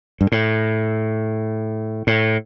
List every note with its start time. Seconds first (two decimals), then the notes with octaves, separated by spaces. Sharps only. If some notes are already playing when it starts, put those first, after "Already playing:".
0.21 G2
0.32 A2
2.07 A2